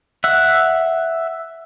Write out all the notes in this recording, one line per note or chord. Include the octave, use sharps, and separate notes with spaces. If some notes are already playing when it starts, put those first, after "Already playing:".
E5 F#5